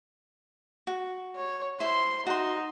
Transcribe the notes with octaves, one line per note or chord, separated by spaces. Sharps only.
F#4
C#5
E4 C5 C6
D#4 F#4 C6